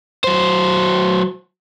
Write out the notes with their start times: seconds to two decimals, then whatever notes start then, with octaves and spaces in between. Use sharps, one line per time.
0.24 F#3 C5